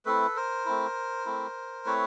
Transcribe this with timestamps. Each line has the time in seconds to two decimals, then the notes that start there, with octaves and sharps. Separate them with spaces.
0.05 A3 C4 E4 A4 B4
0.36 A#4 C5
0.65 A3 C4 E4
1.26 A3 C4 E4
1.85 A3 C4 E4 B4 C#5